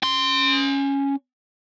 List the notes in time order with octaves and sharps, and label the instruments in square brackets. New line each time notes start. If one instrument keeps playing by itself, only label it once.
[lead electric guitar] C#4 C6